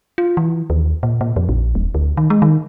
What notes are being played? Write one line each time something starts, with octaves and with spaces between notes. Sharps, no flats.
F4
E3
D#2
A#2
A#2
F2
A#1
D#1
D2
D#3
G#3
D#3